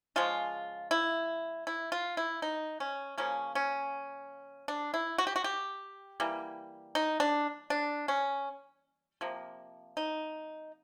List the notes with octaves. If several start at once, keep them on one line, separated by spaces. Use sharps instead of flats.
C#3 F3 G#3 F4
E4
E4
F4
E4
D#4
C#4
C#3 F3 A#3 C#4
C#4
D4
E4
F#4
G4
F#4
G4
E3 G3 A#3
D#4
D4
D4
C#4
C3 F3 A#3
D#4